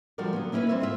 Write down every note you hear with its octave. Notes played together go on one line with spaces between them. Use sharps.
D3 F3 G3 F#4 A#4 D5
D3 F#3 B3
A#3 C#4 E4 G4 A#4 B4
G3 C4 B4 C#5 E5
G#2 A#3 E4 F4 G4 E5